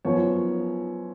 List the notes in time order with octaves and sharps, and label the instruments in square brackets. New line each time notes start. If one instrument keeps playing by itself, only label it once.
[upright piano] F#2 F3 B3 C#5